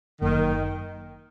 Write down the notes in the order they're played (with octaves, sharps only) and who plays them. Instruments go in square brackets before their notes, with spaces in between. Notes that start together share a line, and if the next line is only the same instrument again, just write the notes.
[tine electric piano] G1 F#2 F#3 A#3 [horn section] D#3